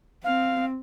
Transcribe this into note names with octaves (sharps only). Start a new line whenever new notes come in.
C4 F5